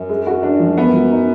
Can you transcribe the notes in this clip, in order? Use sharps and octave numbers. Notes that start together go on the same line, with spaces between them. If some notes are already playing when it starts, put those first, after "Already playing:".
Already playing: F#2
G#3
F#4
D4
F3
B3
F#3
D#4